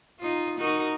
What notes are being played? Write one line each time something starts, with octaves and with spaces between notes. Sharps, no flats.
D#4 F4
D#4 F#4 A#4